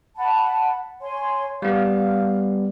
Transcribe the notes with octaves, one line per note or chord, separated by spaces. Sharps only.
F#5 A5 B5
C#5 G#5 C6
G3 B3 F5